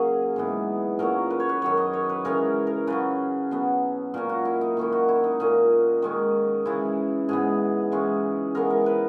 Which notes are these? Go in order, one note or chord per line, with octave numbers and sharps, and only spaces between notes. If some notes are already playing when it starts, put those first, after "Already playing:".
Already playing: C#3 F#3 A#3 C#4 G#4
G#2 E3 B3
A#2 F#3 C#4 A#4
B4
C#5
B4
F#2 D#3 F#3 C#5
D#5
C#5
B4
C#3 E3 G#3 C#4 A#4
A#4
C#3 F#3 C#4 B4
B2 F#3 B3
A#2 A#3 C#4 A#4
F#4
E4
D#4
D#3 A#3 C#4 E4
F#4
E4
D#4
A#2 A#3 C#4 D#4
D#3 G#3 C#4
C#3 E3 G#3 E4
G#2 E3 B3 G#4
C#3 E3 G#3 C#4
C#3 E3 G#3 B3 A#4
A#4
B4